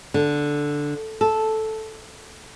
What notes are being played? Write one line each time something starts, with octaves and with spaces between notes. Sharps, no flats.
D3
A4